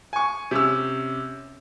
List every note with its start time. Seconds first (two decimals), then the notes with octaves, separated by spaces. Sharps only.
0.13 G#5 C#6
0.51 C3 C#4 E6